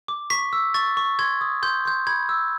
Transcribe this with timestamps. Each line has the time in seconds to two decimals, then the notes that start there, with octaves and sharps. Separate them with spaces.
0.08 D6
0.30 C#6 B6
0.53 E6
0.74 C#6 A6
0.97 C#6
1.19 C6 G#6
1.41 D#6
1.63 C6 G6
1.85 C6 G6
2.07 B5 G#6
2.29 E6